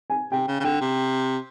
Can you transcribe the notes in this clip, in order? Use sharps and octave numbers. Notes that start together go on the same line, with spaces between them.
G#5
C3 G5
C#3
C#3
D3 G5
C3